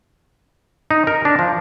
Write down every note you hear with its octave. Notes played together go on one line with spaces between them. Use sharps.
D#4
A#4
D4
F3